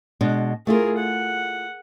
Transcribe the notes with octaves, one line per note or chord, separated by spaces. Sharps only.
B2 G#3 D4
A3 E4 F4 G#4 A#4
F#5